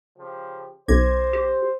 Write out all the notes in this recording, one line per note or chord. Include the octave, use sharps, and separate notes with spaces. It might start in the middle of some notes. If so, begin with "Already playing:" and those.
C#3 F3 G4
B1 C5 D6 G#6 A#6
G4